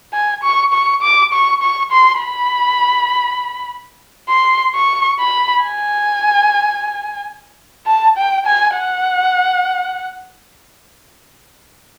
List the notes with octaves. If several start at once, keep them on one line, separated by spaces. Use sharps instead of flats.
G#5
C#6
C#6
D6
C#6
C#6
C6
B5
C6
C#6
B5
G#5
A5
G5
G#5
F#5